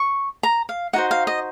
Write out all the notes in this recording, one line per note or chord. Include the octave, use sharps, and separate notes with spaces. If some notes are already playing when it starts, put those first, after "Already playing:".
Already playing: C#6
A#5
F5
D#4 F#4 C5 F#5
F5
D#5